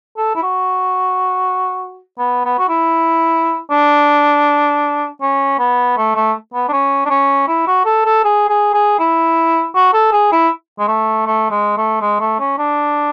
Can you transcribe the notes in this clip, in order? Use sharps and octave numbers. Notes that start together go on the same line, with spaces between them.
A4
E4
F#4
B3
B3
F#4
E4
D4
C#4
B3
A3
A3
B3
D4
C#4
D4
C#4
E4
F#4
A4
A4
G#4
G#4
G#4
E4
F#4
A4
G#4
E4
G#3
A3
A3
G#3
A3
G#3
A3
C#4
D4